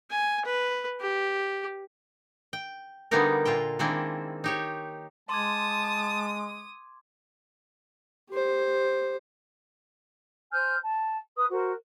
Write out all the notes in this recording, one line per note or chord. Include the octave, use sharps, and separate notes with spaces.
G#5
B4
G4
G5
D3 G3 A#3 B3 D#4 A#4
A#2 F4 E5 G5
D#3 G#3 A#3 C4 D4 E4
D#4 G4 C#5
G#3 A5 C6 D6 D#6 G#6
G4 C5
C5 G#5 F6 G6
A5
B4 D#6
F#4 A#4 C5